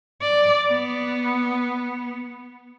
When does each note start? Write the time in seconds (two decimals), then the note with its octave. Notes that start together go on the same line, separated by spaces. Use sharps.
0.22 D5
0.69 B3